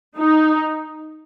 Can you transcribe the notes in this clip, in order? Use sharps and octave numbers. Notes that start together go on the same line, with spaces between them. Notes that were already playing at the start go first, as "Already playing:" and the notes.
D#4